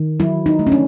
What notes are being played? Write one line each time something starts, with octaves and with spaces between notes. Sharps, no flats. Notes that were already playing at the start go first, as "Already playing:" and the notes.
Already playing: D#3
F#3 E4
D#4
A3
C#4
D4